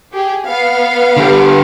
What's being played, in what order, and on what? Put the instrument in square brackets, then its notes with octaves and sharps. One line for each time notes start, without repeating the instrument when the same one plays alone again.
[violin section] G4 G#4
B3 F5
[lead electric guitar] D3 G4